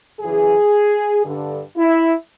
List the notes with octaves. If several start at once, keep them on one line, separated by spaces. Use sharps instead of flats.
F#2 C#3 E3 G#4
G2 D3
E4